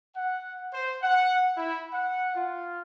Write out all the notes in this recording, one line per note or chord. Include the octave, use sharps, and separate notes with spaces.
F#5
C5
F#5
E4
F#5
F4